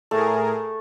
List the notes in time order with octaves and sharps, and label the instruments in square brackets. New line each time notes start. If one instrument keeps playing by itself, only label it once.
[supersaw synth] A2 G#4 A#4 [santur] A3